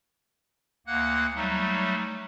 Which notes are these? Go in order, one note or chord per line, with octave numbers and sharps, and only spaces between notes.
D2 A#3 F#5 F#6
F#3 G3 A3 D#4